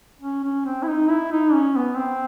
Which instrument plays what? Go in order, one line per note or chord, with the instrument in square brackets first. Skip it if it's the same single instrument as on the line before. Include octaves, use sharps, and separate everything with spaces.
[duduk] C#4
C#4
C4
E4
D#4
E4
D#4
C#4
B3
C4